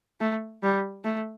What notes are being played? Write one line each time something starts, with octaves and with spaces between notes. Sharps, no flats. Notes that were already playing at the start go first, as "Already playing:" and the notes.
A3
G3
A3